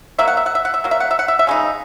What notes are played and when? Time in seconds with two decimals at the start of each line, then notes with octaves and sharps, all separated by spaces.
0.18 F#3 A#3 E5
0.28 F#5
0.37 E5
0.46 F#5
0.55 E5
0.65 F#5
0.74 E5
0.84 F#3 A#3
0.91 E5
1.00 F#5
1.11 E5
1.19 F#5
1.28 E5
1.39 E5
1.47 C#3 G#3 D#4